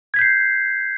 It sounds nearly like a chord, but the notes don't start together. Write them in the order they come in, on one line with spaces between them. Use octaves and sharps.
G#6 B6 G6 C7